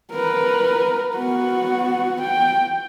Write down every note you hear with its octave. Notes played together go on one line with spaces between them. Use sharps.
A#4 B4
B3 F#4
G5